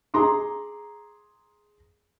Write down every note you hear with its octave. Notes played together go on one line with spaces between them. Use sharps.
G#4 A#5 C6 D6